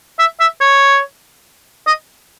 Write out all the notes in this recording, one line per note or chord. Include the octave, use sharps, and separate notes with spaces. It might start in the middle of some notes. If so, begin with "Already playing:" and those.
E5
E5
C#5
D#5